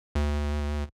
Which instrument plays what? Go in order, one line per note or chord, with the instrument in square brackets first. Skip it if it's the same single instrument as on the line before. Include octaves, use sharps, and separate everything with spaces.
[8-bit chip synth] D2